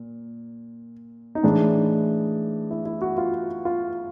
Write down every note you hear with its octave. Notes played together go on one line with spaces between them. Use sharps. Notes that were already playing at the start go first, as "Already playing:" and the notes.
Already playing: A#2
D#4
A2 E3 G#3 D4
E4
E4
F#4
F4
F4